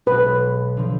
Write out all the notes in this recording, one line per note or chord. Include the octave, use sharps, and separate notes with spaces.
B1 B2 G#3 B4
D3 F3